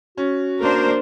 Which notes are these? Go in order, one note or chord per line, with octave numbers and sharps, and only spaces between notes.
C#4 F#4
A#3 D4 A#4 C5